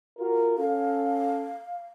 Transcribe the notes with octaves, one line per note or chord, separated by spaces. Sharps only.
F4 F#4 A#4
C#4 A4 F5